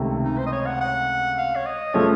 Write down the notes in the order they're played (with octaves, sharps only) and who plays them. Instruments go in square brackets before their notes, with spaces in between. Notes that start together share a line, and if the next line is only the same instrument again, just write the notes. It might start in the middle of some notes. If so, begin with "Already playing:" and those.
Already playing: [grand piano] C#2 C3 D#3 A3
[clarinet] D#4
C5
D#5
C#5
F#5
F#5
F5
C#5
D#5
[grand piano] C#3 F3 A3 [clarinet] C#5